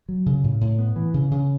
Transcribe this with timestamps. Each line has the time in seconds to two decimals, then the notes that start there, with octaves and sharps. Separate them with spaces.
0.09 F#3
0.26 C#3
0.44 A2
0.61 A2
0.79 B3
0.96 E3
1.14 C#3
1.31 C#3